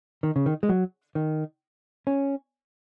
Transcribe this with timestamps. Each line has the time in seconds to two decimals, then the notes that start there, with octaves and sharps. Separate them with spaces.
0.23 D#3
0.36 C#3
0.46 D#3
0.63 G#3
0.69 F#3
1.15 D#3
2.07 C#4